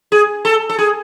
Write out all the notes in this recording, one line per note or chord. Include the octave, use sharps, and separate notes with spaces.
G#4
A4
A4
G#4